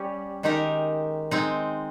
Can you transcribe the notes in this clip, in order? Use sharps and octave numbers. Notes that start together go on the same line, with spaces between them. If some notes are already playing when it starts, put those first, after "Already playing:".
Already playing: G3 C#4 G4
D#3 G#3 D#4 G4 A#4
G#3 C4 D#4